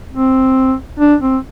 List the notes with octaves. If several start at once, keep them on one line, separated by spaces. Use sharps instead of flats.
C4
D4
C4